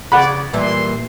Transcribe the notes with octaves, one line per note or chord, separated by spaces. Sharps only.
C#3 D5 F#5 B5
A#2 E3 G3 C6